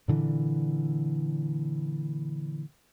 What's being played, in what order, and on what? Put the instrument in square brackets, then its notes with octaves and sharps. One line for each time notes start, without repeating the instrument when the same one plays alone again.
[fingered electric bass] A#2 D3 E3